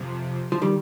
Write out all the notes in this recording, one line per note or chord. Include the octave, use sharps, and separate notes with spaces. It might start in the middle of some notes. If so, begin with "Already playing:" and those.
Already playing: F2 C3 F3
F3
D#3 G3